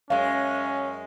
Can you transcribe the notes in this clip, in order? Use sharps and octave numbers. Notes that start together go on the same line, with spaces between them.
F#2 G#3 C#4 F5